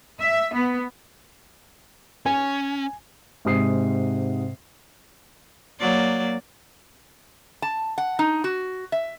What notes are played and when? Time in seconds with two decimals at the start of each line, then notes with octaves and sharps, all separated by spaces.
0.18 E5
0.52 B3
2.26 C#4 G#5
3.45 G#2 C3 D#6 C7
5.81 F#3 A#3 D5
7.62 A5
7.98 F#5
8.19 D#4
8.44 F#4
8.92 E5